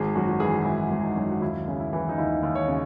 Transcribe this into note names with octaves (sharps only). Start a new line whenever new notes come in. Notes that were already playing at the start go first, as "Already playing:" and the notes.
Already playing: G#1 G#4
F#2 F#4
F#4
E3 G#4
G#1 E4
G#1
D#4
F#2
F#4
D#2 E4
C#3
E4
E3
D#4
D#2 E4
D#2
C#5
C#3